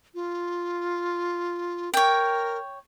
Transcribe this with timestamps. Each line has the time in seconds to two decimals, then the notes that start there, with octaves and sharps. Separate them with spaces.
0.15 F4
1.94 A#4 C#5 G5